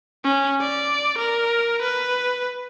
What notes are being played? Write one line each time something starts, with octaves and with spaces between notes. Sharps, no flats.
C#4
D5
A#4
B4